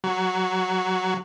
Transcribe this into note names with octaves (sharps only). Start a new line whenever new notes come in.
F#3